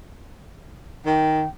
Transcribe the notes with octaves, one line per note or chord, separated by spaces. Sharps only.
D#3 G5